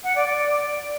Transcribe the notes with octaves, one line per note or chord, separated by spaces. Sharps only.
F#5
D5
D5